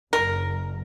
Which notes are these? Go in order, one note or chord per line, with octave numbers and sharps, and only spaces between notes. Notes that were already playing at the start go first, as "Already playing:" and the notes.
F#1 A#4